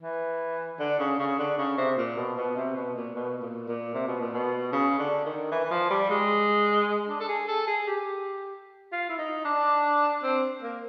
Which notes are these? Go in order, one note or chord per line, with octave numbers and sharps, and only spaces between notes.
E3
D3
C#3
C#3
D3
C#3
C3
A#2
B2
B2
C3
B2
A#2
B2
A#2
A#2
C3
B2
A#2
B2
C#3
D3
D#3
E3
E3
F3
G3
G#3
D4
A4
G#4
A4
G#4
G4
F4
E4
D#4
D4
C4
A#3